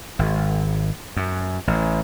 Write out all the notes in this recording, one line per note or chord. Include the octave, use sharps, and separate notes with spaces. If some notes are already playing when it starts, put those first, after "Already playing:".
G#1
F#2
A1